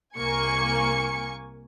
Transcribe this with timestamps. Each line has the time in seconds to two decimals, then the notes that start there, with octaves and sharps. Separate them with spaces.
0.18 C2 A#3 G#5 C#6 C#7